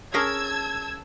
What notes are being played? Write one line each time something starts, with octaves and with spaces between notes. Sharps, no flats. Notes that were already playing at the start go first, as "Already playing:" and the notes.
C#4 G#4 A#4 A5 E6 G#6